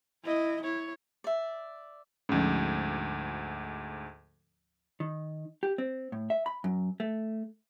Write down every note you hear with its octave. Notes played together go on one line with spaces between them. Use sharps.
E4 D#5
E4 C#5
D5 E5
D2 G#2 F3 C#4
D#3
G4
C4
A2
E5
B5
F#2
A3